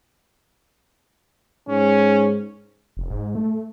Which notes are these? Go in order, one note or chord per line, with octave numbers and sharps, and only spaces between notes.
G#2 C#4
F1
G#2
A3